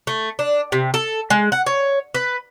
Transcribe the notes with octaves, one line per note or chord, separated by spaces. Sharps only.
A3
D4
C3
A4
G#3
F#5
C#5
B4